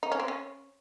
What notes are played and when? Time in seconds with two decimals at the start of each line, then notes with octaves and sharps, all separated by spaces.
0.03 D#4
0.12 C#4
0.20 C4
0.28 C#4